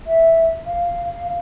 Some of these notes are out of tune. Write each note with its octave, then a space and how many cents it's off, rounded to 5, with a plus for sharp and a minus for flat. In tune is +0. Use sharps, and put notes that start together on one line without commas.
E5 -5
F5 -10